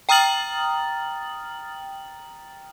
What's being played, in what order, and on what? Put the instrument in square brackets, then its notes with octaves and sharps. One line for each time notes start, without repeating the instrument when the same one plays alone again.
[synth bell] G5 A#5 D#6 F6 A6 F#7